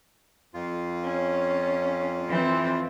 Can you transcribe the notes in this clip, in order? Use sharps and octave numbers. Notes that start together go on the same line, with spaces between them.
F2 F4
C#4
E3 C4